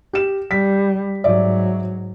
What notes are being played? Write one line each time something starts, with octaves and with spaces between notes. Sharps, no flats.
G4 E7
G3 B6
G#2 F#3 D5 E5